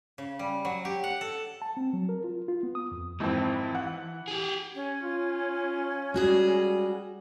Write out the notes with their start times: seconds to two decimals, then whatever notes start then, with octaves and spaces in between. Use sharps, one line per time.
0.18 C#3
0.39 G3
0.65 F#3
0.85 G4
1.04 F#5
1.21 A4
1.62 A5
1.77 C4
1.93 F#3
2.09 A#4
2.24 F4
2.48 F4
2.63 B3
2.75 D#6
2.92 F2
3.20 G#1 F2 E3 C4
3.75 F#5
4.28 G4 G#4
4.75 C#4
5.03 F4
6.14 G3 G#3 F#4 G#4